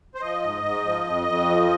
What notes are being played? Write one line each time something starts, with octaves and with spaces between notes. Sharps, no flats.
C5
F3 D#5
G#2
G#2
F3
F2
F2
F3